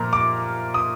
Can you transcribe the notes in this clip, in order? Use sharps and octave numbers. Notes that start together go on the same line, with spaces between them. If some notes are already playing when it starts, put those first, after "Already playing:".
Already playing: A#2 F3 A#3 A#5
D6
D#6